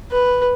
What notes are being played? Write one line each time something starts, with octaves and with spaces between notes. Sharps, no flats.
B4